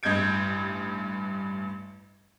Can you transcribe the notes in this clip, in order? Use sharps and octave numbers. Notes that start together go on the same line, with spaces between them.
A1 G2 D#5 G6 G#6 D7